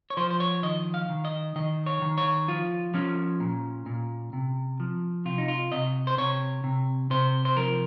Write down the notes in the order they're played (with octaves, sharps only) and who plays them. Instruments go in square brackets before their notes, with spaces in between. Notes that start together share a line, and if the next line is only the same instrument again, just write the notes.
[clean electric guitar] C#5
F3 C5
C5
C#5
D#3 D#5
F5
D#3
D#5
D#3 D#5
C#5
D#3
C#5
F3 F4
F3 C#4
A#2
A#2
C3
F3
C3 F4
D#4
F4
C3 D#5
C5
C3 C#5
C3
C3 C5
C5
F3 A#4